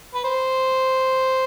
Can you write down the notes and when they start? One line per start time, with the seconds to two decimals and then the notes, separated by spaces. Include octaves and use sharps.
0.14 B4
0.24 C5